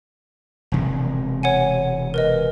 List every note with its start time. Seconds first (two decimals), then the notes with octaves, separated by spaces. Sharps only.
0.72 E1 C3 G#3
1.43 C#5 F#5 G#5
2.14 A#4 B4 D#5